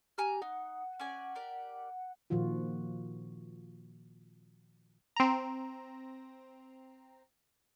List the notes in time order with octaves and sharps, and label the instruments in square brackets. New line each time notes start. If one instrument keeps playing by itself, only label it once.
[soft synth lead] G4 [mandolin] G#5 A#5 F6
[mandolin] D#4 [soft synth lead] F#5
[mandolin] C#4 D5 G#5
G4 A#4 D5
[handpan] A#2 D#3 F3 F4 F#4
[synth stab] C4 A#5